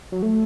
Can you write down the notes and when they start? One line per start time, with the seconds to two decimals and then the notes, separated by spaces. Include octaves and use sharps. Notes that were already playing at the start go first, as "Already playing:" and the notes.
0.12 F#3
0.22 A3